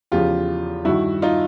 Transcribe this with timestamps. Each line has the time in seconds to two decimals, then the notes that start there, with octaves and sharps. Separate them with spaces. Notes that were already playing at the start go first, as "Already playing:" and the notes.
0.12 E2 C#3 F3 F4 G4
0.85 G2 D#3 E4 F#4
1.22 D#4 F4